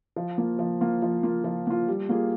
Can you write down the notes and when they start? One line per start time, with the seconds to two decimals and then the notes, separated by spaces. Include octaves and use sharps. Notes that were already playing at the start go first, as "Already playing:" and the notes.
0.16 F3
0.38 A#3 F4
0.59 F3
0.81 A#3 F4
1.02 F3
1.23 A#3 F4
1.44 F3
1.67 A#3 F4
1.88 G3
2.09 A#3 F4 G#4